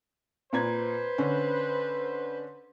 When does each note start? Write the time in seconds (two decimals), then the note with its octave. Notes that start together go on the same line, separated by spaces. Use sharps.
0.53 A#2 B4 C5 A#5 G#6
1.18 D3 C#4